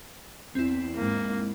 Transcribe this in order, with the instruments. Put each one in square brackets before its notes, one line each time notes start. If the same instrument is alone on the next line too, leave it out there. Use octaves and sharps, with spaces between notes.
[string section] E2 [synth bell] C4 E4
[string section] G#2 [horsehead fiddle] A#3